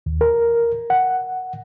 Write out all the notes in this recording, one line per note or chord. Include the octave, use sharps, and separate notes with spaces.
D#2
A#4
F#5